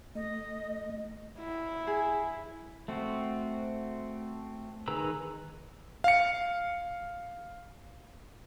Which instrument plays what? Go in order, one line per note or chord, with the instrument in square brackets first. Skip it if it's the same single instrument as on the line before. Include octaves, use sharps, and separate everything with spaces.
[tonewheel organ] A3 [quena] D#5
[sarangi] E4
[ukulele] G#4
[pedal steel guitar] A3 C4 F#4
D#3 G#4 B4 A#5 E6
[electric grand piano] F5 C#7